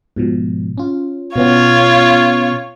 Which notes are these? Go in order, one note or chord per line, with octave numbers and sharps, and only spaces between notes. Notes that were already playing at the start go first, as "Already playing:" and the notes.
G#2 B2 F3
C#4 F4
B2 B3 C#4 F4 C#5